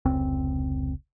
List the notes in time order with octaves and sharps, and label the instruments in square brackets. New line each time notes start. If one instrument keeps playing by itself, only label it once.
[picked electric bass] F1 C#2 C4